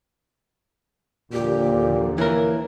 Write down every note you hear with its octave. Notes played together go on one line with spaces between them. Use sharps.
D#2 A#2 D3 F3 G4
E3 A#3 A#4 C#5